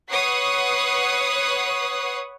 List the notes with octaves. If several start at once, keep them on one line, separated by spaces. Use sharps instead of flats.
B4 C#5 F#5 C#6 D#6 C7